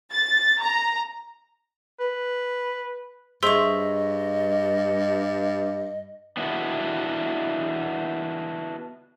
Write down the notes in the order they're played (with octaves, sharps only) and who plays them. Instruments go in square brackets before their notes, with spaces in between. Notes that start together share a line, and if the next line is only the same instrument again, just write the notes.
[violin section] A6
A#5
[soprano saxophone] B4
[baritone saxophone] G2 [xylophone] G#4 C5 C6 [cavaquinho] C#5 E5 [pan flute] D#5
[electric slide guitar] B3 D4 E4 F#4